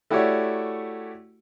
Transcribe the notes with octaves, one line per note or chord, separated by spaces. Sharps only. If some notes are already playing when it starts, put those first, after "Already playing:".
A3 E4 F#4 G4 C#5 D5